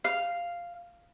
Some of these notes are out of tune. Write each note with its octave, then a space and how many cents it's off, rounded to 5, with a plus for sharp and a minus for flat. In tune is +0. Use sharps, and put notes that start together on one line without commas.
F5 -5